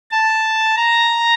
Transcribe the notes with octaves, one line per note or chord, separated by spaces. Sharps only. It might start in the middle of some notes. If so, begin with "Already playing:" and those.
A5
A#5